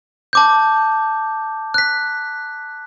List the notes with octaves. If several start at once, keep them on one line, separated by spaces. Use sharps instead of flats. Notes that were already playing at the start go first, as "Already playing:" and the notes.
A5 D6 G6
F#6 B6